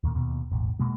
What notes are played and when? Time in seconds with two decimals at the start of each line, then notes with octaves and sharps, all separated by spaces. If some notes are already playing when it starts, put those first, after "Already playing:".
0.04 D#2 A#2
0.15 D#2 B2
0.51 E1 A1
0.79 B2 G#3 A#3